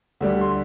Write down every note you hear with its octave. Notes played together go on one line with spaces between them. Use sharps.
D2 D3 G3
C6